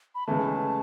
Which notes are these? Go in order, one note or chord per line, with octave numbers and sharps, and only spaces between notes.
B5
C#2 C#3 E3 A3 A5